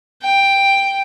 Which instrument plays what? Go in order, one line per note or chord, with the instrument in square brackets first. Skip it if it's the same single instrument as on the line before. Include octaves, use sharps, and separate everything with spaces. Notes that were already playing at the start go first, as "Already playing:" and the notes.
[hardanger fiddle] G5